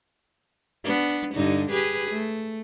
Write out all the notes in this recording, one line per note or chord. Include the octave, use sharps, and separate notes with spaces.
B3 D4
G2 D3 D#4
G4 G#4 B4
A3